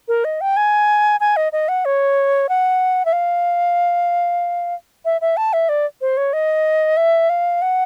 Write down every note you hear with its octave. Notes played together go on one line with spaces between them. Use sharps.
A#4
D#5
G5
G#5
G#5
D#5
D#5
F#5
C#5
F#5
E5
F5
E5
E5
A5
E5
D5
C5
C#5
D#5
E5
F5
F#5